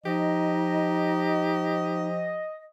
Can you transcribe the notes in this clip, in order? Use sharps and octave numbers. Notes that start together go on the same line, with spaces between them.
F3 D#4 G4 D#5